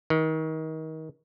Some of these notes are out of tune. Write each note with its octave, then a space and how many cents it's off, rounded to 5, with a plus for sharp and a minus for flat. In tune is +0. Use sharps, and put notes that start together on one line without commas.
D#3 +30